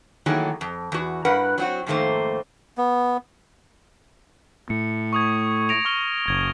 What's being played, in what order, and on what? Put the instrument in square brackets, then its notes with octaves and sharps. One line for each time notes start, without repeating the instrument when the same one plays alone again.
[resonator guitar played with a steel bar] D#3 E3 F#3 A3 A#3 G#4
F2
E2 F#4
G2 A#4 B4 F#5
F#3 C4 F#4
F2 G#2 D#3 A3 A#3 C5
[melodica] B3
[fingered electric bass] A2 [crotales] C#7
[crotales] C#6 D#6 G#6
A#6 D7 F7
C#6 F6 G7
[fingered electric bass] F#1 [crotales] G#6